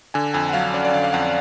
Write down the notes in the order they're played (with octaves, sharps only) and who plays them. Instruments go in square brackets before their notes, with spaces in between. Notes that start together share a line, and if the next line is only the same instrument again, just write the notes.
[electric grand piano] D3 G#5
F2 G#5
F#5
F#3 F5
C#4 D5
D5
D3 F5
F5
F2 F#5